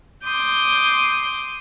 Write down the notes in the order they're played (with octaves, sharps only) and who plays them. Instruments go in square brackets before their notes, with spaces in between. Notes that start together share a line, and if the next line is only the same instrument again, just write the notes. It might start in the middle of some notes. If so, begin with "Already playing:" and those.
[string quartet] C6 D6 D#6 G6